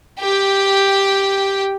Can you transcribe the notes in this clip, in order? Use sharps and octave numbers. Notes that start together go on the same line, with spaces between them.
G4 G5